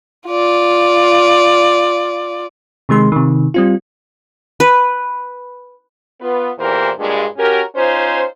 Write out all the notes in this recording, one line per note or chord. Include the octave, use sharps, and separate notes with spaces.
F4 D5
C3 D#3 G#3 C6
C3 D#3
G3 C4 F4
B4
B3 F4 B4
E2 A#2 E3 G4 A#4 C5
G2 A#2 G#3
C#4 F#4 G4 A#4
C#4 D#4 F4 C5